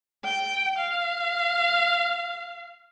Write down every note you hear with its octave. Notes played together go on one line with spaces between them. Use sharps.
G5
F5